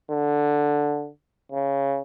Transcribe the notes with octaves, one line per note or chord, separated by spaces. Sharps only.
D3
C#3